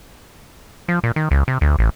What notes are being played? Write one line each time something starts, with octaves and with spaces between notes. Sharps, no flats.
F3
A#2
D#3
C#2
C3
D2
A1